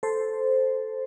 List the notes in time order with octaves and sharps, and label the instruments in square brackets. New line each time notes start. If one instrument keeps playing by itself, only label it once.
[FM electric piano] A4 C5